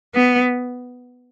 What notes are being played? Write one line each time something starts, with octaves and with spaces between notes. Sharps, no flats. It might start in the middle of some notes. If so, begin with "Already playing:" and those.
B3